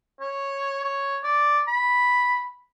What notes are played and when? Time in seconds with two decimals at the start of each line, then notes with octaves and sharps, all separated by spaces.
0.21 C#5
0.84 C#5
1.23 D5
1.68 B5